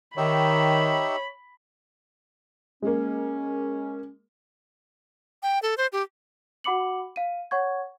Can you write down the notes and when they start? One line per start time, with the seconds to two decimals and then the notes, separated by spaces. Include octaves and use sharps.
0.17 D#3 D#4 G4 C#5 E5 B5
2.82 G#3 A#3 C#4
5.43 G5
5.63 A4
5.78 C5
5.93 G4
6.64 F#4 F#5 B5 D6 C#7 F#7
7.16 F5 D#7
7.51 C#5 F#5 C#6 G#6